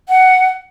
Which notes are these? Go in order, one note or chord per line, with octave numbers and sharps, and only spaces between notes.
F#5